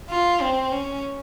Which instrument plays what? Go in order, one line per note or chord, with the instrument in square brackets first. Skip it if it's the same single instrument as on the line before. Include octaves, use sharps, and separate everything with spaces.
[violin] F4
C4
C#4